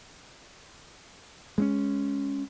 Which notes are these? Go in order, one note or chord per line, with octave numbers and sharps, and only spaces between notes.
G#3 C4 C#4